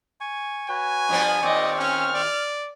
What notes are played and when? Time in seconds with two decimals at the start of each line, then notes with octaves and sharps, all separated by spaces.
0.21 G#5 C#6
0.69 F#4 B4 C#5 G#5
1.09 G2 F3 B3
1.43 D#2 A#2 C4 D5 D#5 C#6
1.79 C#4 F6
2.15 D5